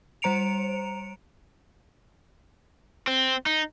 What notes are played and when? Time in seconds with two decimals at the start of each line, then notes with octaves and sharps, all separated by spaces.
0.22 G3 C5 A#5 C#7 D7 F7
3.07 C4
3.46 D#4